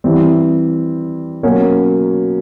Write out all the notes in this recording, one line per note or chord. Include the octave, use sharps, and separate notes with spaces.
E3 G3 C4
B2 F#3 A#3 C#4